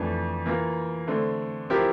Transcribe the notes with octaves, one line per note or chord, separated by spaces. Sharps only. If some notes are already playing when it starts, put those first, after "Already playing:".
Already playing: F2 E3 A3 D4
E3 A#3 F4 A#4
D3 A3 C4
F3 C4 E4 G4 A#4